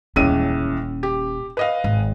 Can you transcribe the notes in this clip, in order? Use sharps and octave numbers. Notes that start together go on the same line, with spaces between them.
D#1 C#2 E3 C#4 D#7
G4
B4 D#5 F5
G#1